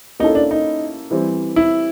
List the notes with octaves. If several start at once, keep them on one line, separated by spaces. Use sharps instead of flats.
A#3 C#4 D#4 E4 A4
D4
D#4
E3 G3 C4
E4